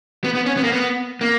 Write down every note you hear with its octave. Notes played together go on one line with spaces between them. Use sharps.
B3
B3
C#4
B3
A#3
B3
A#3